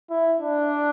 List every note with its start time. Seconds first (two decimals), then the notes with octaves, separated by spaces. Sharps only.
0.10 E4
0.40 D4